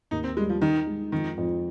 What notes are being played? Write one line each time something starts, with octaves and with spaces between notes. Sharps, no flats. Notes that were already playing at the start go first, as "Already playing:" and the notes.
D#2 D#4
C4
G3 G#3
F3
D#3 D#4
G#3
F2 D#3
F2